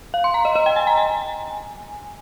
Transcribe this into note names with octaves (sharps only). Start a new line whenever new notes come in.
F5
C6
A#5
D#5
D#5
G5
G#5
A#5
G#5